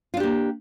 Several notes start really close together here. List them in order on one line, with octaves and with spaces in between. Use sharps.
F4 D4 G4 A#3